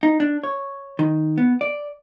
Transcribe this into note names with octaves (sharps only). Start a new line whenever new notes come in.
D#4
D4
C#5
D#3
B3
D5